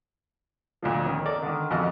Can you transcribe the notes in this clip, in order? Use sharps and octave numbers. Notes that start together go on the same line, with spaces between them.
D2 A#2 F3
D#3 C#4
A4 A#4 D5
D3 D#3
A1 F2 F#4 D#5